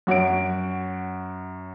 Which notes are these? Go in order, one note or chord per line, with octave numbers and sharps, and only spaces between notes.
F#2 F#4 C#5 F#5 D7